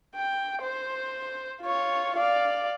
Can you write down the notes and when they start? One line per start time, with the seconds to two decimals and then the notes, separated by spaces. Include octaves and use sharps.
0.16 G5
0.62 C5
1.62 F4 C#5
2.16 D5 F5